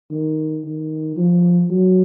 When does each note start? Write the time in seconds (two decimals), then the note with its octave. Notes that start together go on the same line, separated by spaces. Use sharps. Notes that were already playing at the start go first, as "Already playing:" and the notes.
0.11 D#3
0.65 D#3
1.17 F3
1.71 F#3